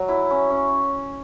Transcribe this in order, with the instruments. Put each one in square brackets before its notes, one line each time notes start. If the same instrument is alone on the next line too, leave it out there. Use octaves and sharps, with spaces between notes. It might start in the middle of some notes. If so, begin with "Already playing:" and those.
Already playing: [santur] F#3
E4
C#4
C#4